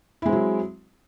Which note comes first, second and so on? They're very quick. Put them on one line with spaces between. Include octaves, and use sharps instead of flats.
E4 G#3 C4 F#3